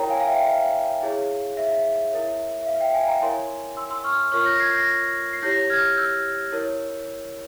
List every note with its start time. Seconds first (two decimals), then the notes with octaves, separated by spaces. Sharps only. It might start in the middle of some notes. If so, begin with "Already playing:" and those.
Already playing: E4 A#4 C#5 G5 A#5
0.09 F5 G#5
0.20 F5
0.27 E5 G5
0.46 F5
1.02 E4 G#4 C#5
1.57 E5
2.12 E4 A#4 C#5
2.62 E5
2.67 F5
2.80 E5 G5
2.94 F5 G#5
3.08 G5 A#5
3.22 E4 A#4 C#5 G#5 C6
3.77 C6 E6
3.90 C6 E6
4.04 C#6 F6
4.32 F4 A#4 C#5 C#6 F6
4.46 G6 A#6
4.60 G#6 C7
4.74 G6 A#6
5.33 C7
5.42 E4 G4 C#5 G6 A#6
5.70 F6 G#6
5.97 E6 G6
6.52 E4 A#4 C#5